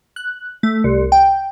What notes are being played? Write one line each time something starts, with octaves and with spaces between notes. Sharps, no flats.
F#6
A3
C2
G5